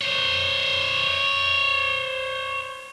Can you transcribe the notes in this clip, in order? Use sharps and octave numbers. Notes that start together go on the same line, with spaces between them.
C5 C#5